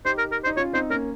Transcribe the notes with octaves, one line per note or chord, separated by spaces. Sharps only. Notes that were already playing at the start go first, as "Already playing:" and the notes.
D#4 G4 C5
A#4
A#4
D#4 C5
C#4 F4 C#5
C4 D#4 C5
A#3 C#4 A#4